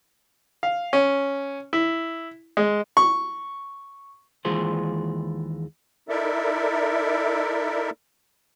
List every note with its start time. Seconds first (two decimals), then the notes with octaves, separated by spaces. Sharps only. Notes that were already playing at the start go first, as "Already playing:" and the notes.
0.63 F5
0.93 C#4
1.73 E4
2.57 G#3
2.97 C#6
4.45 D#2 E3 G#3 F4 G#4 C5
6.09 D#4 E4 A4 A#4 D5 E5